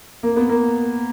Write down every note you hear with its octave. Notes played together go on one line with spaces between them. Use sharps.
A#3
B3
A#3